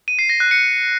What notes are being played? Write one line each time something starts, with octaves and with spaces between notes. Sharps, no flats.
D#7
C7
A#6
F#6
C#7